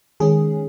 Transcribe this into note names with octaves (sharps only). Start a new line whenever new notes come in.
D#3 G#3 C#4 G#4